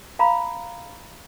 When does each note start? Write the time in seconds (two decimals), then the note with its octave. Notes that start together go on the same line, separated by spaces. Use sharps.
0.19 F5 A#5 B5